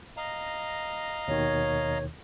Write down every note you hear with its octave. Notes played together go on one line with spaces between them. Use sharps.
D#5 F5 A#5
D#2 B2 D#3 C#5